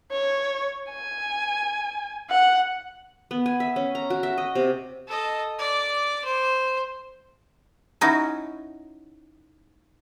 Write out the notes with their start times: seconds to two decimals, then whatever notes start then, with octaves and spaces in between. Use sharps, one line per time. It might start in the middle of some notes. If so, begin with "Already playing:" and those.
0.12 C#5
0.91 G#5
2.30 F#5
3.31 B3
3.46 G#5
3.60 E5
3.76 C#4
3.95 A#5
4.10 F#4
4.23 E5
4.38 D#5
4.55 C3
5.08 A4 D#5
5.59 D5 D6
6.24 C5
8.01 C#4 D#4 E4 F#4